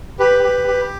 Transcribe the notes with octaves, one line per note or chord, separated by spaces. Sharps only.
G4 B4
G4
G4